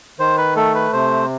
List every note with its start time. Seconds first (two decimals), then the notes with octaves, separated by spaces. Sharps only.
0.19 D#3 C5
0.38 B4
0.56 A3 A4
0.75 B4
0.93 C3 C5